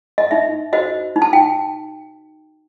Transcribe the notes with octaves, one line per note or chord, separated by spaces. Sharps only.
D#5
D#4 E5
F#4 C5 D#5
D#4
A5
G5